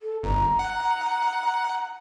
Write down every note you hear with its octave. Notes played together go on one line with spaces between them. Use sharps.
A4
G1 A#5
F#5